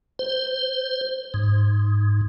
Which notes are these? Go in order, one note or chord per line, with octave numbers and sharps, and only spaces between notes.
C5
G#2